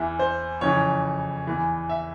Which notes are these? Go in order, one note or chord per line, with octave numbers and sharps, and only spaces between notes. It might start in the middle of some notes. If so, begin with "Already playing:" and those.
Already playing: E2 E3 E5
C5
F2 C#3 E3 C#5
E2 E3
E5